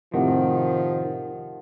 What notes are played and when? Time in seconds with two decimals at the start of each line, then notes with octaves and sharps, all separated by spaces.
0.14 F2 A2 C3 D#3 F3 G4 A#4 F#5